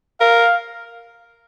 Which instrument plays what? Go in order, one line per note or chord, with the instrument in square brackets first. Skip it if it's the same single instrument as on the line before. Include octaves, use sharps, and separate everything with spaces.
[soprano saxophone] A#4 [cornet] F5